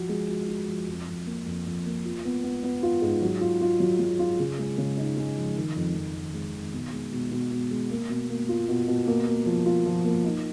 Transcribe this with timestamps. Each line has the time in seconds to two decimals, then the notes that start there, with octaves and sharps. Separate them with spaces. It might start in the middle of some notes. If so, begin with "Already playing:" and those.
Already playing: F3 F#4
0.09 G#3
0.29 F#4
0.48 F#4
0.68 F3
0.88 F2
1.08 F2
1.26 A#3
1.46 F2
1.66 F2
1.85 A#3
2.05 F4
2.25 B3
2.44 B3
2.63 B3
2.83 F4
3.02 G#2
3.22 F#3
3.41 F4
3.61 F4
3.80 F#3
3.99 F#3
4.19 F4
4.39 C#3
4.59 G#3
4.78 C#3
4.97 D#4
5.17 G#3
5.37 F3
5.56 D#3
5.76 F2
5.94 F2
6.15 D#3
6.34 G#3
6.53 D#3
6.73 B2
6.93 G#3
7.12 B2
7.31 B2
7.51 B2
7.71 G#3
7.91 A#3
8.09 B2
8.29 A#3
8.49 F4
8.68 B2
8.88 B2
9.07 A#3
9.26 A#3
9.46 F3
9.66 F4
9.86 F3
10.05 A#3
10.24 D#4